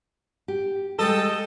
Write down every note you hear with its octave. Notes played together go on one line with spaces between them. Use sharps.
G4
G3 G#3 A4 D#5 G5